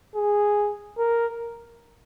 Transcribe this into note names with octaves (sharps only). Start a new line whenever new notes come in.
G#4
A#4